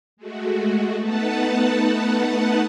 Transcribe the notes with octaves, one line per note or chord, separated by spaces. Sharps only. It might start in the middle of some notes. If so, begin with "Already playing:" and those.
G#3 A3 F#4
A3 B3 D#4 B4 F#5 A5